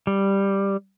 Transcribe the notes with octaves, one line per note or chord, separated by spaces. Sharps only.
G3